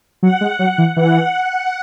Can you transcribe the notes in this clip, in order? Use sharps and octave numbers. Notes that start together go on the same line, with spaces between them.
F#3 F#5
G#3
F#3
E3
E3 F#5